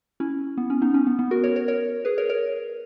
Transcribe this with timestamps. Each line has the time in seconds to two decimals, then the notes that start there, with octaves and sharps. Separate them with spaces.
0.20 C#4 E4
0.57 B3
0.70 C#4
0.82 B3 D#4
0.94 C#4
1.07 B3
1.19 B3
1.31 F#4 A#4
1.44 A#4 C#5
1.56 A#4 C#5
1.68 A#4 C#5
2.05 G#4 B4
2.18 A#4 C#5
2.29 A#4 C#5